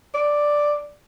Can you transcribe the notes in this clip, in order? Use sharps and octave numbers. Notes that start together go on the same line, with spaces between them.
D5